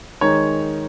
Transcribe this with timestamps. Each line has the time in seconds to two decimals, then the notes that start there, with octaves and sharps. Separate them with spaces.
0.21 D#3 G#3 D#4 C#5